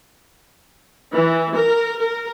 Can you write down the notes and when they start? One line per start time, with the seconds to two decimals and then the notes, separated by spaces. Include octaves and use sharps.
1.12 E3
1.54 A#4
1.99 A#4